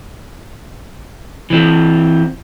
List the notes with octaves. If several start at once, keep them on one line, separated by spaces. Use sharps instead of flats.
E3 C4